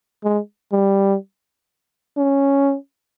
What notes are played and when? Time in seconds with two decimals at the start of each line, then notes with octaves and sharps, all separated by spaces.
0.24 G#3
0.72 G3
2.17 C#4